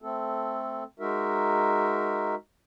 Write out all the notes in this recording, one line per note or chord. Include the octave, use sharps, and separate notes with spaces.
A3 C4 A4
G#3 D#4 F#4 A#4 E5